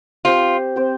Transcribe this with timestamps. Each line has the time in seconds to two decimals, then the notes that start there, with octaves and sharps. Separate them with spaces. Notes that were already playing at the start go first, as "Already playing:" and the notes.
0.25 C4 F4 G4 C5
0.76 C4 G4 C5